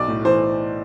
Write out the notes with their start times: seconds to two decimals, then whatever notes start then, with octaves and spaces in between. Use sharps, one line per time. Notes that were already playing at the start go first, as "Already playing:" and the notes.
Already playing: B1 D5
0.08 A2
0.25 E3 C5